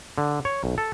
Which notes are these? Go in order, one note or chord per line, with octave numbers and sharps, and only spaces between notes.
D3
C#5
B1
A4